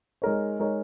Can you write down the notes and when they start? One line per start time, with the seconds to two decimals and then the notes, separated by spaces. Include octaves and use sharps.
0.22 G#3 D#4 A#4 C#5
0.59 G#3 D#4 A#4 C#5